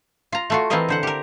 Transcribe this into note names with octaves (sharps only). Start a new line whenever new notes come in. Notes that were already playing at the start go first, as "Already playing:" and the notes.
F4 A#5
A3 F4 F#4
E3 C4 E4 F4 A#4 D#5
D3 C5 F#5
G4 A#4